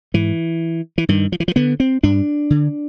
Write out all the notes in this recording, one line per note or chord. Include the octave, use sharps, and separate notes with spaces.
G#2 E3
E3
G2 D#3
F3
E3
F3
D3 B3
C4
G2 D4
D3